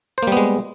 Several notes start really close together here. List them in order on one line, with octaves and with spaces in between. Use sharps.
C5 A#3 G3 B3 G#3